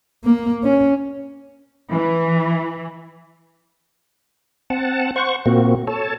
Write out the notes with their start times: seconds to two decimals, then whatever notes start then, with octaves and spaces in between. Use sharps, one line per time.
0.25 A#3
0.64 C#4
1.91 E3
4.70 C4 F#5 A5
5.16 C5 F#5 C#6
5.46 A#2 A#3 C4 F#4
5.87 A4 C#5 A5